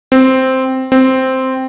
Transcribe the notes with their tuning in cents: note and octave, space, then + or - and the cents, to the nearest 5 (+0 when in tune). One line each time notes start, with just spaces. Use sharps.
C4 -5
C4 -5